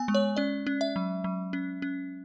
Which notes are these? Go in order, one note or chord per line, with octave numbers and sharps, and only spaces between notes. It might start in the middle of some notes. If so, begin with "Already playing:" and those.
Already playing: B3 G#5
G#3
C#5
C#4 D5
C#4
E5
F#3
F#3
C#4
C#4